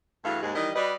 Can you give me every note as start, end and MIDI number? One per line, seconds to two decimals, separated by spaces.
0.25 0.39 43
0.25 0.39 52
0.25 0.39 57
0.25 0.39 66
0.25 0.39 68
0.25 0.39 77
0.42 0.54 39
0.42 0.54 44
0.42 0.54 56
0.55 0.71 51
0.55 0.71 52
0.55 0.71 55
0.55 0.71 75
0.75 0.93 55
0.75 0.93 66
0.75 0.93 71
0.75 0.93 74
0.75 0.93 75